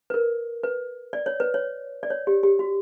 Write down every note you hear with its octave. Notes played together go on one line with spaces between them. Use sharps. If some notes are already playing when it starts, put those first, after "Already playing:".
B4
A#4
B4
D5
C#5
B4
C#5
D5
C#5
G4
G4
F#4